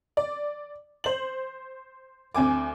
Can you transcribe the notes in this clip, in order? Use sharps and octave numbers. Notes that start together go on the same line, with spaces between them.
D5
C5 F#7
D2 C4 G#5 D6